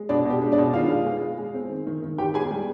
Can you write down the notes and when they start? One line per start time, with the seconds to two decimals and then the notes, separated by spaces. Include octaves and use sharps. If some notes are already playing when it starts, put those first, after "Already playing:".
Already playing: G#3
0.09 B2 D4 D5
0.25 B2 G4
0.41 G#3
0.52 D4 D5
0.58 B2
0.73 D#3 F4 F5
0.90 G#3
1.06 G#3
1.22 G#3
1.38 G#3
1.54 C4
1.70 D#3
1.87 D#3
2.02 D#3
2.18 D#3 G4 G5
2.34 B3 G#4 G#5
2.51 G3